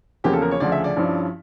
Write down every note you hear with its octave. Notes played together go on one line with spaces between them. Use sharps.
E2 C#3 F3 A#3 C#4 G4
A4
A#4
C#5
D2 C#3 F3 D5
E5
D5
G2 F3 C#4 E4